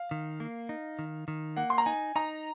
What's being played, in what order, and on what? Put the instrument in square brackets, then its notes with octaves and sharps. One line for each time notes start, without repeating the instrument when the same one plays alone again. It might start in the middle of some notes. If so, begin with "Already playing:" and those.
Already playing: [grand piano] F5
[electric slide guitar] D#3
A#3
D#4
D#3
D#3
[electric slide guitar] A#3 [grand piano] F#5
[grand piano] C6
A#5
[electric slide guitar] D#4 [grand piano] G#5
[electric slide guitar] D#4 [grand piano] A#5